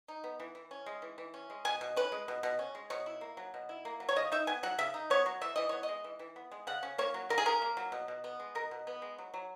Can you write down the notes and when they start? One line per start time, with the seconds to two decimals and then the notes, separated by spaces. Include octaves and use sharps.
0.08 D#4
0.24 B3
0.40 E3
0.55 E3
0.71 C#4
0.86 G#3
1.02 E3
1.18 E3
1.34 C#4
1.50 G#3
1.65 B2 G#5
1.81 B2
1.96 C#4 B4
2.12 G#3
2.28 B2
2.43 B2
2.59 C#4
2.75 G#3
2.90 B2 C#5
3.06 E4
3.21 A#3
3.37 F#3
3.54 B2
3.69 E4
3.85 A#3
4.00 F#3
4.09 C#5
4.16 C#3 D#5
4.32 D#4 E5
4.47 B3 G#5
4.63 F#3 F#5
4.78 C#3 E5
4.94 D#4
5.10 B3 C#5
5.26 F#3
5.41 E3 E5
5.56 E3 D#5
5.69 B3 C#5
5.83 D#5
5.89 G#3
6.04 E3
6.19 E3
6.36 B3
6.51 G#3
6.67 C#3 F#5
6.83 C#4
6.98 A#3 C#5
7.14 F#3
7.29 C#3 A#4
7.38 G#4
7.46 C#4 A#4
7.62 A#3
7.77 F#3
7.92 B2
8.08 B2
8.24 B3
8.40 G#3
8.55 B2 A#4
8.71 B2
8.87 B3
9.02 G#3
9.19 F#3
9.34 F#3